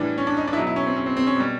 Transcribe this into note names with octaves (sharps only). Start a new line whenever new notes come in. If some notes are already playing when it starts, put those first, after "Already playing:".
Already playing: A2 E3 G3 D4
C#4
D4
D#4
D4
E4
B2 F#3 D#4
E4
C#4
C4
C#4
C4
C4
C#4
B2 G3